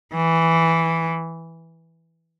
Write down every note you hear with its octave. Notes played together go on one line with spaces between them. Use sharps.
E3